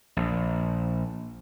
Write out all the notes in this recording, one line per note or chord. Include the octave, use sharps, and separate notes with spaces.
A#1